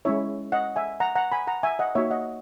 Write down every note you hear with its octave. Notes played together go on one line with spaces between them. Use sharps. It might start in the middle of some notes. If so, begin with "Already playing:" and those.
G#3 C#4 E4 C#5 E5
D#5 F#5
E5 G#5
F#5 A#5
F#5 A#5
G#5 B5
F#5 A#5
E5 G#5
D#5 F#5
A#3 D#4 F#4 C#5 E5
D#5 F#5